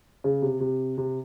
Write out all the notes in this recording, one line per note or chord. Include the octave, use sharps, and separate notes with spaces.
C#3
C3
C3
C3